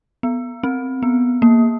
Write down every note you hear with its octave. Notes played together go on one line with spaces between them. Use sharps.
B3
C4
B3
A#3